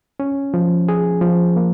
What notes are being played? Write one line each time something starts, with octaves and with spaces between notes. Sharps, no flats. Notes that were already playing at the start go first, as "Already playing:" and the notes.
C#4
F3
G#4
F3
A#3